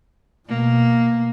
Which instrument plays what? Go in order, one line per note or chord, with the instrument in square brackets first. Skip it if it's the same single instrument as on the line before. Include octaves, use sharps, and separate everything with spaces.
[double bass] B2 [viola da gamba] A#3